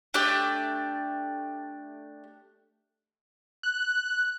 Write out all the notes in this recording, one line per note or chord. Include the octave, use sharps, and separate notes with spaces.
A3 D4 G4
F#6